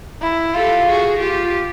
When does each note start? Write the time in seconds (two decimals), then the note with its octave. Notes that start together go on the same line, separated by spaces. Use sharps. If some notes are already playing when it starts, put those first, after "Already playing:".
0.22 E4
0.54 F4 G4 A4
0.87 F#4 G#4
1.20 F4 G4